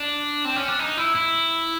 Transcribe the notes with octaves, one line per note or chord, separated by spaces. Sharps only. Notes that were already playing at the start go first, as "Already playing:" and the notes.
Already playing: D4
C4
C#4
D4
D#4
E4
E4